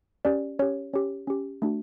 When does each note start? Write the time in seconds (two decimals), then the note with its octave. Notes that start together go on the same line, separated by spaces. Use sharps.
0.25 C#4 G4 D5
0.59 C#4 G4 C#5
0.93 C#4 G4 C#5
1.27 C#4 G4
1.62 A3 D4 F#4